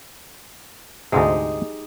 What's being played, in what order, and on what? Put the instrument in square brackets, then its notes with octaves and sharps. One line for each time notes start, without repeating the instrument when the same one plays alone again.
[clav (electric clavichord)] D2 G#2 C3 [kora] G#3 D#4 G4